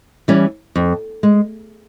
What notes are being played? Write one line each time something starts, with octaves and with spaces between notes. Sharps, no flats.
E3 G3 C#4
F2
G#3